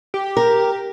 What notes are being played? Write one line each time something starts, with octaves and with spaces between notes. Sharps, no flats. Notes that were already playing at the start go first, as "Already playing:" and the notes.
G4
A#4